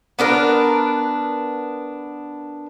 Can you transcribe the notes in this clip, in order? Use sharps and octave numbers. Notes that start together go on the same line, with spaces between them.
B3 D4 A#4 B4